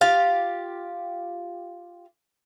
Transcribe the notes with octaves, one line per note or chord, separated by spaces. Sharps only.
F4 G4 F5